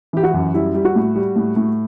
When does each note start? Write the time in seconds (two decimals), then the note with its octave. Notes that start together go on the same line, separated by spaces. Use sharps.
0.13 E3 G4
0.23 F#4
0.34 F#2
0.54 G3 E4
0.74 G3
0.85 F#4
0.95 A2
1.16 G3
1.36 A2
1.56 A2